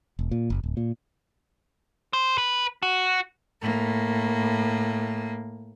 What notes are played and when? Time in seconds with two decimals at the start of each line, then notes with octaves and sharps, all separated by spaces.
0.19 E1
0.31 A#2
0.50 F#1
0.64 D1
0.77 A#2
2.13 C5
2.38 B4
2.83 F#4
3.62 A2 A#3